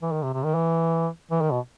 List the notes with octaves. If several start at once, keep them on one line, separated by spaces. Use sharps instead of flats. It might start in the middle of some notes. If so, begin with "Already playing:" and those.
E3
D#3
C3
C3
D#3
E3
E3
D#3
B2